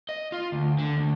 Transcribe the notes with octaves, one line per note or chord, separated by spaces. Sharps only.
D#5
F4
D2
D3
D2